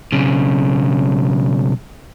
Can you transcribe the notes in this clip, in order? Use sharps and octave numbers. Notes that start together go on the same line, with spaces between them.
B1 C#3